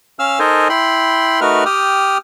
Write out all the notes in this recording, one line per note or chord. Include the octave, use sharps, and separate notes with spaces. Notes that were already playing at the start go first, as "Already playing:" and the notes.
C#4 F5 E6 F6
D#4 A4 A#4 C5 D#5 G#5
E4 G5 B5 C6
A3 D#4 F#4 A#4 B4 F6
G4 G5 D#6 F6